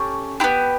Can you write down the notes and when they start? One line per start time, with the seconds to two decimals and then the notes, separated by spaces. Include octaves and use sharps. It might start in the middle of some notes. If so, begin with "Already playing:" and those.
Already playing: A3 C#4 G4
0.40 E4 G4
0.44 B3